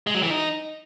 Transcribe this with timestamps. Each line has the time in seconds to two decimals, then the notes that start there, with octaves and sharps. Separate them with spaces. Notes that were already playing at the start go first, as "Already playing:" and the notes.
0.07 G#3
0.15 F#3
0.22 E3
0.30 D#4